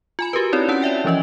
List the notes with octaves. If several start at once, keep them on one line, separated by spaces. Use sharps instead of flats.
F4 G#5 B5
F#4 G4 A#4 B4
C4 D#4 E4 G4 C#5 D5
C#4 F#5 A5
C#5 D5 E5 G5
E3 F3 C#4 D#5